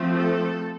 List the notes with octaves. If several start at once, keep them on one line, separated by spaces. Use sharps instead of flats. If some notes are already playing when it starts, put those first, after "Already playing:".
Already playing: F3 A3 C4
A4